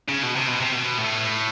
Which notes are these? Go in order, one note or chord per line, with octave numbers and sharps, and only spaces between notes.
C#3
B2
C3
B2
C3
B2
A2